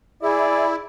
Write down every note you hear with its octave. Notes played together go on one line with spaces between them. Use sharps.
E4 G#4 D5